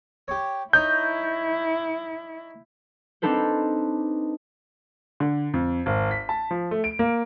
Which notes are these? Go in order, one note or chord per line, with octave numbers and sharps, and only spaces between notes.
G4 C#5
D#4 E4 C#5 A#5 G6
C4 D4 D#4 A4 B4 C5
D3
F2
G#1
B6
A5
F3
A3
D7
A#3